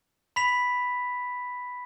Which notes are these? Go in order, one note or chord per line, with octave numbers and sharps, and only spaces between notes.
B5 B6 F7